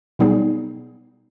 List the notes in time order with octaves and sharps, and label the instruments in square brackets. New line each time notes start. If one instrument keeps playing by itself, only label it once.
[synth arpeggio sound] B2 F#3 G3 B3 D#4 G#4